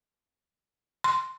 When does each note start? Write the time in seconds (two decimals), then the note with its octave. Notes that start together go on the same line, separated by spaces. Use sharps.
1.04 C6